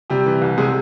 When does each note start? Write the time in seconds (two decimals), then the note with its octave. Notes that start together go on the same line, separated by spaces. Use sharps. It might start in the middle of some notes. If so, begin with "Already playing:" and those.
0.10 C3 G3 G4
0.26 E3
0.42 C2
0.58 C3 G#3 G#4